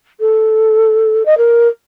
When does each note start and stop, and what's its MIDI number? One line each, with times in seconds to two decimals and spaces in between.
0.20 1.23 69
1.26 1.37 75
1.37 1.68 70